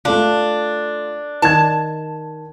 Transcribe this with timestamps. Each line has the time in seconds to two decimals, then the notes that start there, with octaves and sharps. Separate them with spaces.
0.05 A3 D4 F4
1.42 D#3 A5 G#6